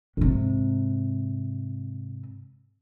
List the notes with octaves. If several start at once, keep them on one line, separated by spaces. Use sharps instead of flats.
G#2 C3